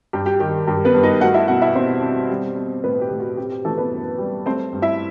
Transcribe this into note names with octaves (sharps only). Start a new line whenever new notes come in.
G2 G4
G4
D#3 G4
G2 G4
B3 B4
G2
D#4 D#5
A3 F#4 F#5
E4 E5
B2 F#4 F#5
E4 E5
B2 C4 C5
C4
G3
C4
A2 B3 B4
G4
A2
F#4
C4 G4
G4
E3 A3 A4
B3 B4
F#2
G3
A3 C4 C5
G2
E4 E5